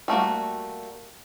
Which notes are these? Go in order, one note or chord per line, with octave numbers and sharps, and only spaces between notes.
G3 A3 A#3 F#4